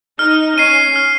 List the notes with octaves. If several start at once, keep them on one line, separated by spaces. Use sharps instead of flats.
D#4 F6
C#4 C7 D#7
F6